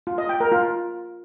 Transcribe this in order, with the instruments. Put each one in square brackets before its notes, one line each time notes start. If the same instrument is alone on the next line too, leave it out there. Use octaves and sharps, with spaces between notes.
[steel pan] F4
D#5
G5
A#4
F4